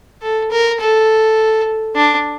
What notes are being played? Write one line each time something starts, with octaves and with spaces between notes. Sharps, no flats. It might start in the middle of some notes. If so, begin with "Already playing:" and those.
A4
A#4
A4
D4